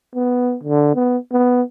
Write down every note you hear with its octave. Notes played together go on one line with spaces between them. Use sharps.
B3
D3
B3
B3